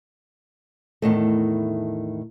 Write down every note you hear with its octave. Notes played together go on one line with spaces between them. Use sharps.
E2 A2 D#3 A3